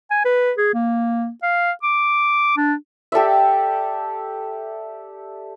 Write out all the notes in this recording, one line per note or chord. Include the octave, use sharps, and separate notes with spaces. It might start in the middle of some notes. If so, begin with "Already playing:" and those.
G#5
B4
G#4
A#3
F5
D6
D4
G4 A4 D5 E5